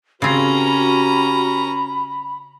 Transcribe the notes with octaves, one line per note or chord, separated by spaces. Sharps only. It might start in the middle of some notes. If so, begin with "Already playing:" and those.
C#3 C4 C#4 F#4 G4 A#4 A#5 B5